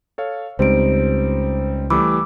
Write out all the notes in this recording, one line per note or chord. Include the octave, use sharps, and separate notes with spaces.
A4 C#5 F5
C#2 G3 C4 D#4 C5 D7
E3 G3 A3 B5 D6 E6